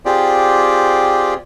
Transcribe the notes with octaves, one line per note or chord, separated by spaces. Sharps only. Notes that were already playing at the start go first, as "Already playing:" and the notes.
C4 F4 G4 G#4 D5